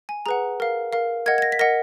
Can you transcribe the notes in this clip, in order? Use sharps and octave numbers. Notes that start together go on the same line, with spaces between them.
G#5
G#4 B4 F#5 A#5
A#4 F5
A#4 F5
A#4 D#5 F#5 G#6
G#6
A#6
B6
A#4 D#5 F#5 A#6